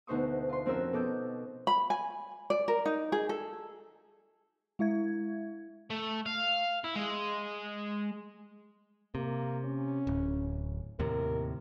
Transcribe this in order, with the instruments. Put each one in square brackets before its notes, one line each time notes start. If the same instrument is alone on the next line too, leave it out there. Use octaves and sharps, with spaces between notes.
[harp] D2 B2 D#4 C5 C#6 D#6
F4 C6
F2 C4 C#4 F#4 A#4 E6
B2 A4 D#5 D6 G6
[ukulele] B5
G#5
D5
A#4
D#4
G#4
A4
[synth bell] G#3 E4 E5 G#6
[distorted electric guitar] A3
F5
E4
G#3
[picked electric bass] C3 [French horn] A#3
[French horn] C#4
[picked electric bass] D1
[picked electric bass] D#2 A2 C3 [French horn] A#4